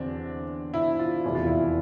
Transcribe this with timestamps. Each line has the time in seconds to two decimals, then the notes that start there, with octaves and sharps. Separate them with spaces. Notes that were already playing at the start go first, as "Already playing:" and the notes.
Already playing: E2 D3 C4 D4
0.74 E4
0.99 F4
1.24 F1 E2 B2 E4
1.35 F4
1.47 E4